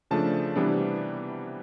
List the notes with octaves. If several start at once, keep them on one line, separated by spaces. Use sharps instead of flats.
C#3 F3 A3 D4 A5
C3 E3 G3 B3 D4